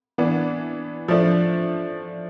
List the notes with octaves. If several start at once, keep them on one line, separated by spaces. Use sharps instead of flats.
E3 B3 D4
F3 A3 D4